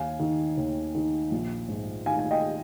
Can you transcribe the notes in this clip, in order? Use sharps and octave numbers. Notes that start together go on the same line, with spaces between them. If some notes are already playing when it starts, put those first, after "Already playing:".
Already playing: D#2 F5 G#5
D#3
D#2
D#3
A#1
G#2
D#3 F5 G#5
G#5
D#5 G5